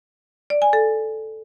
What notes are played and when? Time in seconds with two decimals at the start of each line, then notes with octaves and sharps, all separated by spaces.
0.50 D5
0.62 G#5
0.73 A4